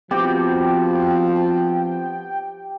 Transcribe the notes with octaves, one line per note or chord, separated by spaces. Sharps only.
F3 B3 C4 F#4 G4 G5